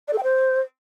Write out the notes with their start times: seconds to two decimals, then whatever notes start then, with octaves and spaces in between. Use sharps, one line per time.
0.07 D5
0.12 A4
0.18 G5
0.23 C5